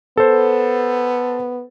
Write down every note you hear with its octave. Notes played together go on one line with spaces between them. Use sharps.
B3 A4 C5